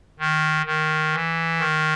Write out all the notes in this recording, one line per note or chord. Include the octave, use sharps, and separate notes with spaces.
D#3
D#3
E3
D#3